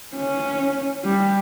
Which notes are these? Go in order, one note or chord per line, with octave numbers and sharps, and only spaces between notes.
C#4
G3